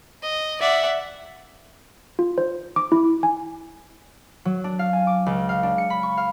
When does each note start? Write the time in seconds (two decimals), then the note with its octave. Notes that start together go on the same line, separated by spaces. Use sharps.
0.23 D#5
0.61 D5 E5 F#5
2.19 F4
2.38 C5
2.76 D6
2.92 E4
3.23 G#5
4.45 F#3
4.64 D4
4.79 F5
4.93 G#5
5.07 D6
5.26 C#2
5.49 F5
5.63 D4
5.78 C#7
5.90 B5
6.03 C#6
6.17 F5